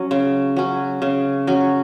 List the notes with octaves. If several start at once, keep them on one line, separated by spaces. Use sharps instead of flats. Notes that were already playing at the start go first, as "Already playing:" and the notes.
Already playing: F#3 C#4
C#3
F#3 C#4
C#3
F#3 C#4